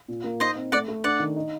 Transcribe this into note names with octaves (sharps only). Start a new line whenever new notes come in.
A#2
A#3
D#4 C5 D#5
C4
A3 D5 F#5
A3
D4 D5 F#5
D#3
D#4